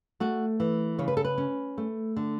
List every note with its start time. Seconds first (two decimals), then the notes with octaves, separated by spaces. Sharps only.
0.20 A3 F#4
0.60 E3
0.98 C#3 C#5
1.08 B4
1.17 A4
1.25 B4
1.38 C#4
1.78 A3
2.17 D3